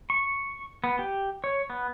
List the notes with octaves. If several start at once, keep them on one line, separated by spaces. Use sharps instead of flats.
C#6
B3
G4
C#5
B3